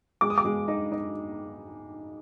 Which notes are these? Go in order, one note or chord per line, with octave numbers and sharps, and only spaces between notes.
G#3 D6
D#6
D6
G#3
D#4
D#4